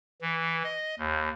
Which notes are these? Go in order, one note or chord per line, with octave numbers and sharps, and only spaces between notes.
E3
D#5
D#2